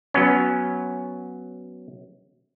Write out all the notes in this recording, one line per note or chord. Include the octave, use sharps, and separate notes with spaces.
F#3 B3 C#4